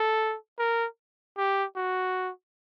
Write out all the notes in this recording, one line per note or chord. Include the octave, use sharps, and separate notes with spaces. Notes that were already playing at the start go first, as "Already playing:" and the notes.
Already playing: A4
A#4
G4
F#4